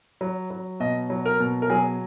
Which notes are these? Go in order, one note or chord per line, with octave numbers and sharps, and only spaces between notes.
F#3
F#3
B2 D#5
F#3
A#4
B2
A#4
F#3 G#4